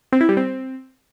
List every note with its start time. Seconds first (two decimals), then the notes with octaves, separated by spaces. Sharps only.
0.12 C4
0.21 E4
0.29 G3
0.37 C4